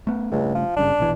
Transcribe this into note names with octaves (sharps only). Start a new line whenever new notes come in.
A3 B3
C#2 G2 C#3 A3
F3
F#1 G2 C#3 D4
A#1 B2 E3